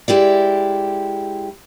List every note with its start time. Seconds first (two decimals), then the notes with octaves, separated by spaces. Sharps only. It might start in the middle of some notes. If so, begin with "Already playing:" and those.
0.08 G#3 E4 G4 D5